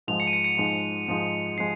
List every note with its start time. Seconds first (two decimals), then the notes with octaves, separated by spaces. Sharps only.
0.08 G#2 F3 G#3 D#4 F7
0.20 C#7
0.27 D#7
0.33 C#7
0.45 C#7
0.57 G#2 F3 G#3 D#4
1.08 G#2 F3 G#3 D#4
1.58 F3 G#3 C7